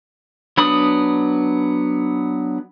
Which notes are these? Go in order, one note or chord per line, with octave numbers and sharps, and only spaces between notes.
F#3 B3 D4 B5 D#6